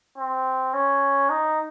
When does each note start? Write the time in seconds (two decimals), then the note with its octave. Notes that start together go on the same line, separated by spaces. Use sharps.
0.18 C4
0.74 C#4
1.30 D#4